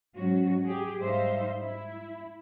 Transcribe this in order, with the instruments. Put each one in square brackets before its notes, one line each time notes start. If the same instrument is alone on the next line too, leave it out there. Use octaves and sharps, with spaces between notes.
[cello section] G#2 F#3 C#4 F#4
G4 G#4
G#2 G3 D#4 C5 E5 F5
E4